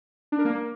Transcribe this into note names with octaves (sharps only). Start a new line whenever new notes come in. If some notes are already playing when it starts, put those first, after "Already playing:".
D4
A#4
A#3